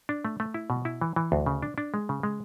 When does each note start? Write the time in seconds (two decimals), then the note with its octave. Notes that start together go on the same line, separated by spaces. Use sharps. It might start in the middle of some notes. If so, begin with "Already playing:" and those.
0.09 D4
0.25 A3
0.40 A3
0.54 E4
0.70 B2
0.85 E4
1.01 E3
1.16 E3
1.32 D2
1.46 C#3
1.62 D4
1.78 D4
1.94 G#3
2.09 C#3
2.23 G#3